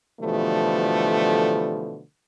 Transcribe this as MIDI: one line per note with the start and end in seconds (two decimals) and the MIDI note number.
0.20 2.01 47
0.20 2.01 50
0.20 2.01 52
0.20 2.01 53
0.20 2.01 55
0.20 2.01 57